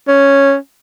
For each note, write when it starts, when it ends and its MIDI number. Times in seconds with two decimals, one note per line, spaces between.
0.08 0.55 61